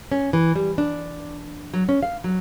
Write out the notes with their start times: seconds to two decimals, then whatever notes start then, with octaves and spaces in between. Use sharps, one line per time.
0.12 C#4
0.33 E3
0.56 G3
0.78 D4
1.74 F#3
1.89 C#4
2.03 F5
2.24 F#3